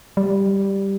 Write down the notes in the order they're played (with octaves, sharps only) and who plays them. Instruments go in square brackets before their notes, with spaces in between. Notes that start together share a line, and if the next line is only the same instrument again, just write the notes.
[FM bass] G3